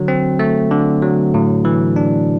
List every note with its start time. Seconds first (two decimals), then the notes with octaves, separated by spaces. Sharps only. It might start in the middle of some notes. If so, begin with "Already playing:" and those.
Already playing: D3 F#3
0.08 C4
0.39 A3
0.71 D3
1.02 F#3
1.34 A2
1.65 E3
1.96 D4